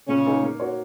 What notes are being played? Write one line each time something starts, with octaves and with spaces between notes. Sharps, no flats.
A#2 C#3 C#4
A#3 D#4 G#4
A#3
F#4 A#4 C#5